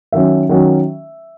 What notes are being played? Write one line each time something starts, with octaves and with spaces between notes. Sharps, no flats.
D#3 F#3 C#4 E5
D#3 F#3 C#4